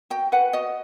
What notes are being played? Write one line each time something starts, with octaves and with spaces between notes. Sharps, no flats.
F#4 G5
B4 F#5
F#4 D#5